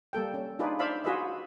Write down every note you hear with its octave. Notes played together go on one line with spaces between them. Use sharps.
G3 A#3 A4 G5
C#4
D4 D#4 F4 G#4 B4 D5
C5 D5 E5 F5 A5 B5
F4 F#4 G#4 B4 D#5 E5